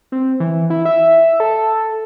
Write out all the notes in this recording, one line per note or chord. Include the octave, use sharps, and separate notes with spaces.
C4
E3
E4
E5
A4